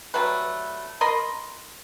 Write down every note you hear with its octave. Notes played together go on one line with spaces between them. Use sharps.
F#3 G3 A3 B4
A#4 D#5 B5 C6